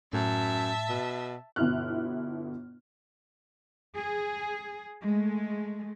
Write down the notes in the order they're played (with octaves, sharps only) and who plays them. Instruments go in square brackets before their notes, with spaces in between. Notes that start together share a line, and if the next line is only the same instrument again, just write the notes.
[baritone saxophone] F#2 [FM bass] A2 [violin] E5 A5
[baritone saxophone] B2
[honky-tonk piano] G1 B2 E4 F6 F#6
[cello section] G#4
G#3 A3